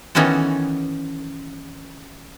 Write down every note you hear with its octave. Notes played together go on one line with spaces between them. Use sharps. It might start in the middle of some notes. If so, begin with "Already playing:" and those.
D#3 E3 B3 C#4 F#4 A4